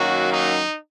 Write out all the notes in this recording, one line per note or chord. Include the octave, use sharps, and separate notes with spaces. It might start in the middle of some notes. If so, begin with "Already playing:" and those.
Already playing: F#2 D#3 F#3 A#3 F#4
D#4